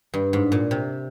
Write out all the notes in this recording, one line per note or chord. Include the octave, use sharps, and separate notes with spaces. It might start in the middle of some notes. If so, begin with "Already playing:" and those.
G2
G#2
A#2
C3